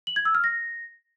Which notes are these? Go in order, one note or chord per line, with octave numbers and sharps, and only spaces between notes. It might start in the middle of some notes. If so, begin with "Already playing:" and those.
F#7
G#6
E6
F6
A#6